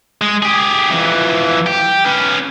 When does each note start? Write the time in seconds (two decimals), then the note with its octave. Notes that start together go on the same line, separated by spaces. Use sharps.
0.22 G#3
0.43 G4 G#4
0.90 F2 E3
1.66 G4
2.05 C#4 B4